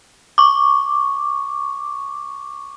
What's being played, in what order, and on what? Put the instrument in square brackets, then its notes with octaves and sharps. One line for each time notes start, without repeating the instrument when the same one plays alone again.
[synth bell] C#6 D6